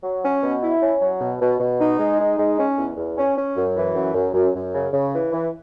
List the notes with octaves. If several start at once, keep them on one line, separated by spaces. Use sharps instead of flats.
F#3
C#4
B2
E4
C#4
F#3
B2
B2
B2
D#4
G#3
D#4
G#3
C#4
E2
E2
C#4
C#4
F#2
E3
F#2
F#2
F#2
F#2
C#3
C#3
E3
E3